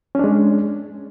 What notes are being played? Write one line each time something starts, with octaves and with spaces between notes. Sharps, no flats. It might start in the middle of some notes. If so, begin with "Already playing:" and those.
G#3 C#4 D4